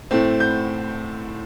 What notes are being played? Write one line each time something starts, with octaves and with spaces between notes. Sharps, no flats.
A2 A3 C4
G6